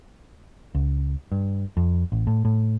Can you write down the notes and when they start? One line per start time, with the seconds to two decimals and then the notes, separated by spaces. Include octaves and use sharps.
0.75 C#2
1.32 G2
1.77 F2
2.12 A1
2.27 A2
2.45 A2